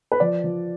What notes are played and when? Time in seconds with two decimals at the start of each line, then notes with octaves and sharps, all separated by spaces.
0.12 B4
0.20 F3 D5
0.44 F3